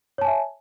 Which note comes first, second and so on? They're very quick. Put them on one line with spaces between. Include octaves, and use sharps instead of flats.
C#5 A5 G#5 E5